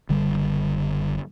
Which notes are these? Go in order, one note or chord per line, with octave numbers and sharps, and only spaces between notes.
F#1 D3 G3